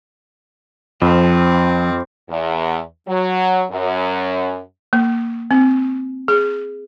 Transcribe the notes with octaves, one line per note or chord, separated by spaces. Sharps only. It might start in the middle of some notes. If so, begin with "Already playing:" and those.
F2 F3 C4
E2
F#3
F#2
A#3
C4
G#4